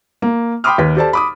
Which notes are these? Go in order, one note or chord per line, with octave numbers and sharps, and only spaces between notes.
A#3
G5 B5 C6 D6 D#6 F6
D#2 B4 B6
G4 A4 C5 D5 A5
B5 D6 D#6